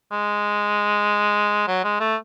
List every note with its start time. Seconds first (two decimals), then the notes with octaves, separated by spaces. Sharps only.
0.12 G#3
1.68 F#3
1.84 G#3
2.00 A3